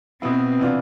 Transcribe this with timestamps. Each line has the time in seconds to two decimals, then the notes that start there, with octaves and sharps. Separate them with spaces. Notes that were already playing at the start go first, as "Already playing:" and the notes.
0.22 B2 B3 C4 E4
0.60 C3 E3 B3 D4 F4